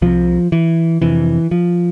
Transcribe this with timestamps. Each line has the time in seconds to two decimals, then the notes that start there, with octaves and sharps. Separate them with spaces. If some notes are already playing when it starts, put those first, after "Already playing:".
0.02 C2 C3 F3
0.52 E3
1.02 F2 C3 E3
1.51 F3